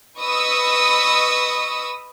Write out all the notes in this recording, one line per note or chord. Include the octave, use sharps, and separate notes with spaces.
B4 D#5 B5 C#6 D#6 E6